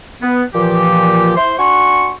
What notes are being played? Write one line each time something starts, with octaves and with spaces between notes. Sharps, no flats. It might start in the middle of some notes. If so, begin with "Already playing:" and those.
B3
A#2 E3 F3 G4
E4 C5 C6
D4 F#4 G#5 C6 C#6